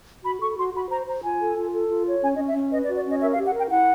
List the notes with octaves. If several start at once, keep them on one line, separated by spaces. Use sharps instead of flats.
F#4 B5
A4 C#6
F#4 C6
F#4 B5
C5 A#5
C5 A#5
F4 G#5
A4
F4
A4
F4
C#5
C#4 G#5
D#5
C#4
E5
C#4
B4 D#5
D5
F#4
D5
C#4 D#5
A#4 E5
F5
G4
F#5
A#4 G5
E4 F#5